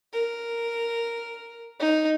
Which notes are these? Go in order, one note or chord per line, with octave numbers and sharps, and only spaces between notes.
A#4
D#4